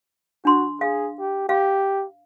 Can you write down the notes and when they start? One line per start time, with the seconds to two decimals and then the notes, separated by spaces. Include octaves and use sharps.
0.45 D4 F#4 C6
0.81 G#4 F5
1.20 G4
1.49 G4 F5